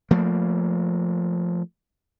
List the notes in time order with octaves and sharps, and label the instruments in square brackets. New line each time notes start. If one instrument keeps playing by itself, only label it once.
[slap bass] F3 A3 A#3